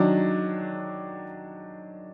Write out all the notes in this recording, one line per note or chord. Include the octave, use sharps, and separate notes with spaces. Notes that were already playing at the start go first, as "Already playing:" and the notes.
Already playing: D#3 F#3 D4